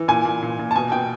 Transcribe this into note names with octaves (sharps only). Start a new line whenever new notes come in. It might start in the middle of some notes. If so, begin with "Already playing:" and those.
Already playing: E3
A#2 G#5
A#2
A#2
A#2
A5
B2 G#5
B2 G5